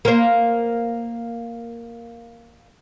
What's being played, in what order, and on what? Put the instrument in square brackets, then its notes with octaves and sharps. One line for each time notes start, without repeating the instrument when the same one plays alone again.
[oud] A#3 C5